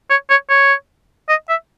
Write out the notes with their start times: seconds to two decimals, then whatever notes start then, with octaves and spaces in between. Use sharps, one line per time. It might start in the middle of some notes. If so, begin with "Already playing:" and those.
0.10 C#5
0.30 C#5
0.49 C#5
1.29 D#5
1.49 E5